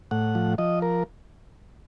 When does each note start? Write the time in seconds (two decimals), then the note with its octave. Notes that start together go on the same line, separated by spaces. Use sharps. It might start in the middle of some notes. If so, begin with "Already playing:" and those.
0.11 A2 F#5
0.35 F3
0.58 F3 D#5
0.82 A#4